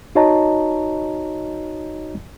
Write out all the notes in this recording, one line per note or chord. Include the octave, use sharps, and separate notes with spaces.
D#4 F#4 C#5 D#5 A5 A#5